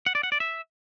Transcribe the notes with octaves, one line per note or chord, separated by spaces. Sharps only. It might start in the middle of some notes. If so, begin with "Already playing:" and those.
F#5
D5
F#5
D5
E5